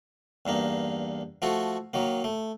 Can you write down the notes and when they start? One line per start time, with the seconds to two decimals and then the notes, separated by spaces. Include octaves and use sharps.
0.46 E2 G2 A#3 D#4
1.42 F3 A3 F#4 A4
1.93 D#3 F#3 A#3
2.24 A3